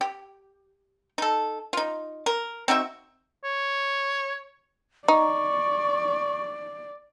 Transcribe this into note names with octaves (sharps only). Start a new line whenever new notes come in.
G4
D#4 A4
D#4 F4
A#4
C4 D#4 F#4 E5
C#5
D#4 D5 C#6